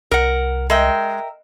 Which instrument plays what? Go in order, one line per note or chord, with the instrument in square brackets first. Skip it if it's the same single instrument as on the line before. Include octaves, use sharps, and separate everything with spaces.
[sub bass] C2 [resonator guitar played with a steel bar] A#4 F#5
[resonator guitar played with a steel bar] G#3 [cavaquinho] A#4 E5 G5